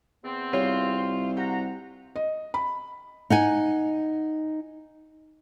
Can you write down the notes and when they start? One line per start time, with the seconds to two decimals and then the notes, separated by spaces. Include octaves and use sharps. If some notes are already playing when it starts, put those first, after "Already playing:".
0.24 E2 B3 C4
0.53 C2 F4 G4 C#5
1.37 F#4 G4 F#5 A#5
2.16 D#5
2.54 B5
3.30 D#4 F#5 G#5